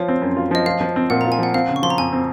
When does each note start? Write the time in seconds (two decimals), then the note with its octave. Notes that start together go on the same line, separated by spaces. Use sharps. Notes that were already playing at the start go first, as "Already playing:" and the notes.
Already playing: F3 F4 C#5
0.08 C4
0.22 F#2
0.37 F4
0.51 F3 D#5
0.66 F4 F5
0.81 F3
0.96 C4
1.10 A#2 F#5
1.21 F4 A#5
1.32 G#5
1.39 F3 F#5
1.54 C4 F5
1.68 C#3
1.76 C#6
1.83 F3 C6
1.90 A#5
1.98 F2 G#5
2.13 C4